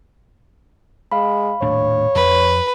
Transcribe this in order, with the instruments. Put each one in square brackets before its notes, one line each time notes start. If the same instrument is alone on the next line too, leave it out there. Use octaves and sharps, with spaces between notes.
[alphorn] G#3 [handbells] F5 B5
[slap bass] D#1 A2 D4 [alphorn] C#5
[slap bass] F2 [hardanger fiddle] B4